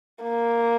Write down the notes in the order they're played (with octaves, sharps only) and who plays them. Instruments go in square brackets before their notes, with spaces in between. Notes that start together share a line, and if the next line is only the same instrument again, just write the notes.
[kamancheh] A#3